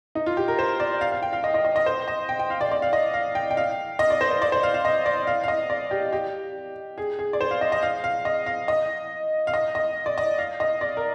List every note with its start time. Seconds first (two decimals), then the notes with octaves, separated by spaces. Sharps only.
0.15 D#4
0.26 F4
0.37 G4
0.48 A#4
0.59 C5
0.80 D5
1.01 F5
1.12 F5
1.23 G5
1.33 F5
1.44 D#5
1.54 D#5
1.65 D#5
1.76 D#5
1.86 C5
2.08 D#5
2.29 G5
2.39 G5
2.50 F5
2.61 D5
2.71 D5
2.82 F5
2.93 D#5
3.14 F5
3.35 G5
3.51 G5
3.57 F5
3.99 D#5
4.10 D5
4.21 C5
4.31 C5
4.42 D5
4.52 C5
4.63 F5
4.74 F5
4.85 D#5
5.06 D5
5.27 F5
5.44 F5
5.48 D#5
5.70 D5
5.91 G4
6.12 G4
6.98 G#4
7.19 G#4
7.33 D5
7.41 C5
7.51 F5
7.61 D#5
7.72 D#5
7.83 F5
8.04 F5
8.25 D#5
8.46 F5
8.68 D#5
9.47 F5
9.54 D#5
9.75 D#5
10.06 D5
10.18 D#5
10.38 F5
10.60 D#5
10.81 D5
10.97 A#4